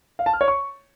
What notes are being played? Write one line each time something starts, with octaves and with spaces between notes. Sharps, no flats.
F5
A5
F6
C#5
C#6